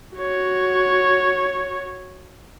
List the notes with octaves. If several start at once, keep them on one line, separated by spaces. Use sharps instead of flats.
F#4 C#5